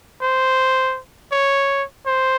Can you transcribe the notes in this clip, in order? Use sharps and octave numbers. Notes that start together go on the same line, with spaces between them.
C5
C#5
C5